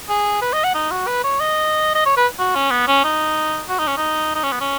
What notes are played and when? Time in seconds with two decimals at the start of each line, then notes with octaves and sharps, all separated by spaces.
0.09 G#4
0.42 B4
0.53 D#5
0.63 F#5
0.74 D#4
0.91 F#4
1.07 B4
1.24 C#5
1.40 D#5
1.95 D#5
2.05 C#5
2.17 B4
2.38 F#4
2.55 C#4
2.71 B3
2.87 C#4
3.04 D#4
3.69 F#4
3.79 D#4
3.87 C#4
3.97 D#4
4.35 D#4
4.43 C#4
4.52 B3
4.60 C#4